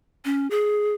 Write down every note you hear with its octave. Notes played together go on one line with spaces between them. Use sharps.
C#4
G#4